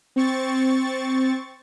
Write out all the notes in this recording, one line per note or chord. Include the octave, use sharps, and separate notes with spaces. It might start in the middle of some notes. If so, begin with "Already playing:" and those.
C4 C#6 A6